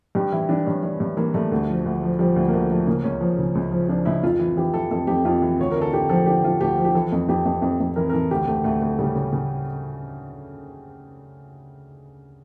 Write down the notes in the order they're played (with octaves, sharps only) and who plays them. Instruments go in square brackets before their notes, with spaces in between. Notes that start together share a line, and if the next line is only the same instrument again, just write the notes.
[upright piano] G2 G4
E3 E4
E3 D4
G2 C#4
E3
G2
E3 A#3
G2 A3
D2
F3
D2
F3
F3 G3
D2
A#3
D2 A3
F3 A3
C#3 A#3
C#2 C#4
F3
C#3
C#2
F3
F3 D4
C#2 E4
F2 F4
E3
E3 G4
E3 A4
F2 A4
F2 G4
F2 F4
E3
D2 C#5
D3 A#4
A4
D3 G4
F3 A4
D3 G4
F3 F4
D2 G4
F3
G4
E3 A4
F2
F2 G4
F2
F2
F2
E3 A#4
A#4
E3 A4
D2 G4
D2 A3
D2 A3
D2
C#3 G3
C#3
C#3